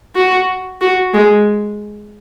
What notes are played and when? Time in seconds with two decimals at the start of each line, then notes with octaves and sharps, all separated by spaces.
0.16 F#4
0.81 F#4
1.14 G#3